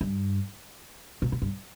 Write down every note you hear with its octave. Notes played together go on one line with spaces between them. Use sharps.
G2
A#2
A#2
G2